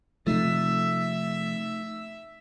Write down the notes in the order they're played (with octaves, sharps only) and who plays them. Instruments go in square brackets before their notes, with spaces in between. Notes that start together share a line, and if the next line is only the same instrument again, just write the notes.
[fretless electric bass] C3 F3 [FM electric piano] A3 D#4 [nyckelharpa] E5